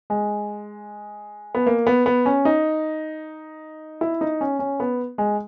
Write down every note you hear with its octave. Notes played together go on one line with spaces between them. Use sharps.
G#3
B3
A#3
B3
B3
C#4
D#4
E4
D#4
C#4
C#4
B3
G#3